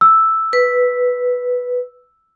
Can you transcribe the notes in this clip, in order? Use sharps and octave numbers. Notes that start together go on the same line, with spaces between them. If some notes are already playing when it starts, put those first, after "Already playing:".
E6
B4